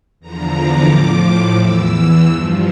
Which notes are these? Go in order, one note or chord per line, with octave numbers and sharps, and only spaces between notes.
E2 D3 F3 A#5
D6
A2 F3
E2 E3 E6
G2 F3